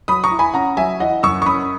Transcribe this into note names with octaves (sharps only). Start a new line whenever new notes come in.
F#3 B5 D#6
A#5 C#6
E4
G#5 B5
C#4 F#5 A#5
F#3 E5 G#5
E3 D#5 F#5
F#2 C#6 E6
C#6
C#4 B5 D#6